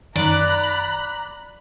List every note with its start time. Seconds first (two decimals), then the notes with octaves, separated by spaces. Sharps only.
0.16 F#2 D#3 D5 A#5 B5 F#6